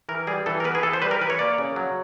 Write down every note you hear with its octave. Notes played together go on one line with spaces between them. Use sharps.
E3 A#4
G3 G#4
E3 A4
A#4
B3 B4
G#4
E3 A4
C5
G3 B4
A#4
E3 B4
C#5
A#3 D5
C#3
F#3